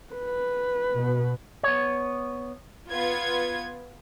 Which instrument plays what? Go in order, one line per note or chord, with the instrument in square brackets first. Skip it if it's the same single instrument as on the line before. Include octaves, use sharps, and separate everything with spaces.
[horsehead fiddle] B4
[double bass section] B2
[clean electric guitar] B3 C#5
[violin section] B3 F4 G#6